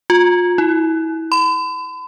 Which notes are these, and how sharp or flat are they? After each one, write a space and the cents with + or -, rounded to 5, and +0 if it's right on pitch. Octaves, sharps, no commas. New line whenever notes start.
F4 +30
E4 -30
B5 +45